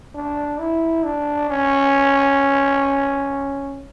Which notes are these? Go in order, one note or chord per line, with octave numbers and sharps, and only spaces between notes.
D4
E4
D4
C#4